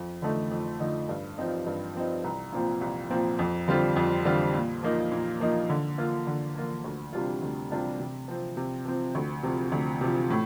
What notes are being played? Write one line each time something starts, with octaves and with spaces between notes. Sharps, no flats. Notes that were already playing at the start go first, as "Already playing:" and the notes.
Already playing: F2
D3 F3 A3 D#4
F2
D3 F3 A3 D#4
G2
F3 C4 D#4
G2
F3 C4 D#4
C2
A#2 F3 C4
C2
A#2 F3 C4
F2
D3 G3 C4 F4
F2
D3 G3 C4 F4
A#2
F3 A#3 D#4
A#2
F3 A#3 D#4
D3
F3 A#3 F4
D3
F3 A#3 F4
D2
C3 G3 D4 F4
D2
C3 G3 D4 F4
C3
F3 C4
C3
F3 C4
D2
C3 F3
D2
C3 F3
A2